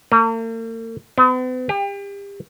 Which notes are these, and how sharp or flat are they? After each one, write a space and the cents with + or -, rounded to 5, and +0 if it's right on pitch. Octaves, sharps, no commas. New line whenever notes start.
A#3 -45
B3 +45
G4 +35